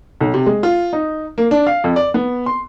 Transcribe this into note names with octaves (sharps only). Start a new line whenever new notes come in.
B1
C3
G#3
F4
D#4
A#3
D4
F5
F2
D5
B3
C6